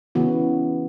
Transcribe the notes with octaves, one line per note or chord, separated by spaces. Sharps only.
C#3 E3 B3 F#4